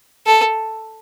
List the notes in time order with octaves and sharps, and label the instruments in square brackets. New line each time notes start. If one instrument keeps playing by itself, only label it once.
[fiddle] A4